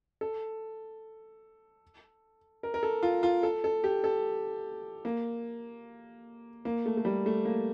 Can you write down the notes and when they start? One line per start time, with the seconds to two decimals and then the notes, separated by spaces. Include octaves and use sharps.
0.21 A4
2.63 A#4
2.74 A#4
2.83 A4
3.03 F4
3.23 F4
3.43 A4
3.64 A4
3.84 G4
4.04 A4
5.05 A#3
6.65 A#3
6.86 A3
6.97 A3
7.05 G3
7.26 A3
7.45 A#3